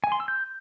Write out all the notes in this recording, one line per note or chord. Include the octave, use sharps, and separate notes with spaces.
G#5
C6
E6
G6